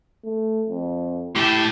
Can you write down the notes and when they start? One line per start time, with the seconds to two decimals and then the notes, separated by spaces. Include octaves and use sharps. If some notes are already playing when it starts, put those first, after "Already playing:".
0.25 A3
0.69 F2
1.36 A2 E4 G4 A5